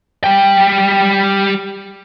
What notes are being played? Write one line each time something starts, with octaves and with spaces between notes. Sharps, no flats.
G3 G5